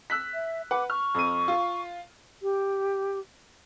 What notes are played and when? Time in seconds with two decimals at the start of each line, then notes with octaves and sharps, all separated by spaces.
0.10 E6 F#6 B6
0.34 E5
0.71 B4 F#5 D6
0.90 C#6 F6
1.15 F2 D#7
1.48 F4
2.42 G4